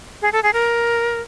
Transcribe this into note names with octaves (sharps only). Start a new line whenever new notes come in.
G#4
A4
G#4
A#4